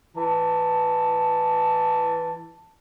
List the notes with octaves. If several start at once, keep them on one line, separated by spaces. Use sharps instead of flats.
E3 A5